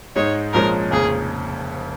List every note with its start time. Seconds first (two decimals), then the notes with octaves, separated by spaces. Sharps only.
0.16 G#2 G#3 D#4 C#5
0.53 A#1 A#2 F3 G#3 C#4 A#4
0.91 F1 F2 C#3 A#3 C#4 G#4